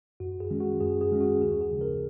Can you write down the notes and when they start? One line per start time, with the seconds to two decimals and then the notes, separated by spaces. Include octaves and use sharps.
0.20 F#2 F#4
0.40 G#4
0.50 D#3 G#3 C#4
0.60 F#4
0.80 F#2 G#4
1.01 G#4
1.11 D#3 G#3 C#4
1.21 F#4
1.41 D#2 G#4
1.61 G#4
1.72 C#3 F3
1.81 A#4